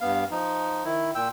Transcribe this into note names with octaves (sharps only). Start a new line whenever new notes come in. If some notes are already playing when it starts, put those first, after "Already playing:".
G2 B3 F5
F3 D#4
D#3 E4
A#2 G5 E6